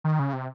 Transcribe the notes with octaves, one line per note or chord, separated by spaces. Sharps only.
D#3
C#3
C3